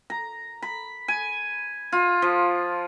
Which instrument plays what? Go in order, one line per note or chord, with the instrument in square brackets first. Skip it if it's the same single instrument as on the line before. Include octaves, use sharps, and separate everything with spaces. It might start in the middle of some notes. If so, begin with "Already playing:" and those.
[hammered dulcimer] A#5
B5
G#5
F4
F3